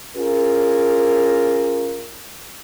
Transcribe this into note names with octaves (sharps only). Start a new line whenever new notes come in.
C#4 F4 G#4 A#4